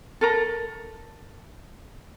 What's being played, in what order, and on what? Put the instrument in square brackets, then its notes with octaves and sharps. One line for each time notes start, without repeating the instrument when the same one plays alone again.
[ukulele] A4 A#4 A#5